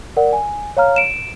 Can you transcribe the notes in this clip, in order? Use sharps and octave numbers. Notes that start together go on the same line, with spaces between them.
A#4 D5 F#5
G#5
C#5 F5 A#5 F6
D7 E7